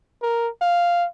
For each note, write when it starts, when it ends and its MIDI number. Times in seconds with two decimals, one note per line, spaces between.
0.22 0.49 70
0.62 1.06 77